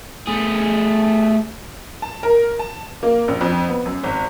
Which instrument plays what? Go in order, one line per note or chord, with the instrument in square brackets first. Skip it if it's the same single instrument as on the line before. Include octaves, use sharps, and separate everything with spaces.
[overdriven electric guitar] A3 G#4
[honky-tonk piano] A5
A#4
A5
A#3
A#1
F2
B3
F#2
G#1